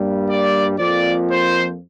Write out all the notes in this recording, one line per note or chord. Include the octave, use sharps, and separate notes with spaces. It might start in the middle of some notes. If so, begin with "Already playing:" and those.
Already playing: G2 G3 A#3
D5
F2 F3 A#3 D5
C5